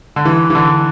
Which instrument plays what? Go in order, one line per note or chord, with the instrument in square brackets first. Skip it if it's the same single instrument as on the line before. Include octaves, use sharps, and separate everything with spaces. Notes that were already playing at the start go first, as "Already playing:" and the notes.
[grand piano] D3
E3
E3
D3